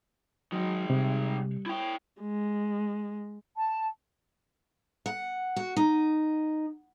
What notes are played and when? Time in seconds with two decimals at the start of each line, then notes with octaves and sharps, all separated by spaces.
0.52 D#3 F#3 G#3
0.90 C3 G3
1.66 E4 G5
2.21 G#3
3.58 A5
5.06 F#5
5.56 F#4
5.77 D#4